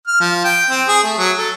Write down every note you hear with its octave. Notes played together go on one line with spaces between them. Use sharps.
F6
F3
G5
C4
G#4
A3
F#3
A4